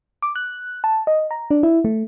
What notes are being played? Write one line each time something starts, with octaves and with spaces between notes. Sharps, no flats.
D6
F#6
A5
D#5
A#5
D4
E4
A3